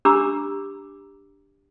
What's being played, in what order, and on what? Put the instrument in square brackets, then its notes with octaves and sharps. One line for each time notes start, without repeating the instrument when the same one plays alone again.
[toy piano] D4 G4 A#5 B5 D6 E6